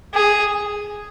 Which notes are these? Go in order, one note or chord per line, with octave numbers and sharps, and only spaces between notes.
G#4